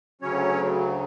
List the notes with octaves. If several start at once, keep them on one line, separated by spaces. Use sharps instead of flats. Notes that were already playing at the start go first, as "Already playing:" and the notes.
D2 C#3 F#3 C#4 C#5